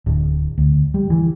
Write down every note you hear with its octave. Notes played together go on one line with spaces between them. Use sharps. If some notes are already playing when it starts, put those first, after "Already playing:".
D1
D2
G3
E3